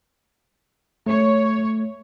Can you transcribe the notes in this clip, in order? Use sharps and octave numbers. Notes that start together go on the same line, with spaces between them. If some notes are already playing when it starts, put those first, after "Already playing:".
A3 C#5